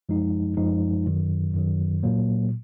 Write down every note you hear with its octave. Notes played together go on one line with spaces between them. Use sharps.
F#2 F3 G#3 D#4
F#2 F3 G#3 D#4
F#2 D#3 F#3
F#2 D#3 F#3
A#2 F#3 A#3